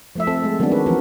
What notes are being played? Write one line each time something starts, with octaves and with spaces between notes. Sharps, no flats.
F3 A3 E5
C4 A4
G#3 A3
D#3 F#3 G#3 B3 C4 D4
F#4 A4 B4
E3 F3 B3 C4 A#4